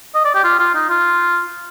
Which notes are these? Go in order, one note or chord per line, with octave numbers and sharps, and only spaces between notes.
D#5
D5
G4
F4
F4
D#4
F4